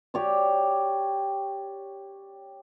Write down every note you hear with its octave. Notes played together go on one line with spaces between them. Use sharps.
G4 C#5 D5